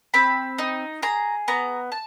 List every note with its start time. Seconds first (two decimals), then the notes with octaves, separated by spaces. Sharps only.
0.14 C4 B5
0.58 D#4
1.02 G#4 A#5
1.48 B3 A#5
1.92 A5